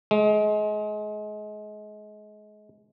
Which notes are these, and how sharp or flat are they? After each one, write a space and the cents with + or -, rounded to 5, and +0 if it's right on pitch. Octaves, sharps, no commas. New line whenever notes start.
G#3 +30